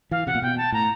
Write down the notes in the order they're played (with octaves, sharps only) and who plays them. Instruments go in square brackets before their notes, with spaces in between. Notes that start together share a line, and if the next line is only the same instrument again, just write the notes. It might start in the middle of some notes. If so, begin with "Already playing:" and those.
[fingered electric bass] E3 [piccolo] F5
[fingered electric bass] C3 [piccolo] F#5
[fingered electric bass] A#2
[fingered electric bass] B2 [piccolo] G5
[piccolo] A5
[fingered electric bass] A2 [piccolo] A#5